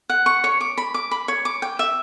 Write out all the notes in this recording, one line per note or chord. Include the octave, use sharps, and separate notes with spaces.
F#5
C#6
C#5
D6
B5
D6
B5
C#5
D6
G5
E5